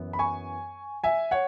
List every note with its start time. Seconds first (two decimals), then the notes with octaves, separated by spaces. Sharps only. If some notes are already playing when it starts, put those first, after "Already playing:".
Already playing: F#2 E3 B3
0.13 B5
0.19 G#5 C#6
1.04 E5 G#5
1.31 C#5 F#5